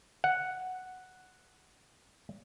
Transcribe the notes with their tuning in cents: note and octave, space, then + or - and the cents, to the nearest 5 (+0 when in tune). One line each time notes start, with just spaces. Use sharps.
F#5 +0